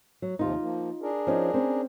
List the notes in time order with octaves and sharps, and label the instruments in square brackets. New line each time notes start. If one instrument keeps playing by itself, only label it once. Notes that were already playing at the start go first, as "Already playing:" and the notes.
[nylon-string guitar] F#3
[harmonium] D#2 C3 F3 [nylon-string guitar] D#4 F4
[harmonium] F3 A#3
D4 G#4 A#4
[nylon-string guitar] F3 C#4 D#4
C4 C#4